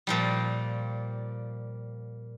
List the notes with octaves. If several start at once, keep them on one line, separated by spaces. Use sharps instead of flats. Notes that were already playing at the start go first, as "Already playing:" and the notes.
A#2 F3 G3